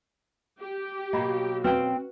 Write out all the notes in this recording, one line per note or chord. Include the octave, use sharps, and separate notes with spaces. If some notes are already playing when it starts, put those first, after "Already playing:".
G4
B2 F#3 A#3 D#5 A#5 B5
C4 C#4 F#4 B4 F5 G5